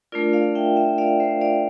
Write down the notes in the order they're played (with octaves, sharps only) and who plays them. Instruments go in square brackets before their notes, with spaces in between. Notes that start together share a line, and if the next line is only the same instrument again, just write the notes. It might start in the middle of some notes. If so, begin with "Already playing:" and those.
[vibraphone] A3 D4 F4 A#4 D5
D5 F5
E5 G5
E5 G5
D5 F5
C5 E5
D5 F5